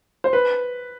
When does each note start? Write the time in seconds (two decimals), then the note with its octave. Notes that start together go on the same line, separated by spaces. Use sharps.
0.24 C5
0.33 B4